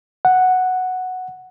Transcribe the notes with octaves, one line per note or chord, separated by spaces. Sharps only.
F#5